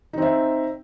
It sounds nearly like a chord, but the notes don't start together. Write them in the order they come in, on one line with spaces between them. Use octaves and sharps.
D#4 C4 E5